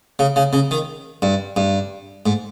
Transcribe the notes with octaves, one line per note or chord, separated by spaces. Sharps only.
C#3
C#3
C#3
D#3
G2
G2
G#2